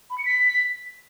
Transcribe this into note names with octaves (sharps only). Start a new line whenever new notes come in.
B5
C#7
B6